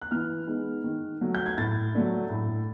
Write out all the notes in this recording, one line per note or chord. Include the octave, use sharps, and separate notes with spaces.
F#6
E3 F6
G#3 B3 D#4
D#3
F#3 A3
G6
G#6
A2 A6
F#3 A3 D4
A2